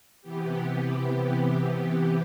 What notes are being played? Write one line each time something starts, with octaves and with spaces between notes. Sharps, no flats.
C3 E3 B3 G4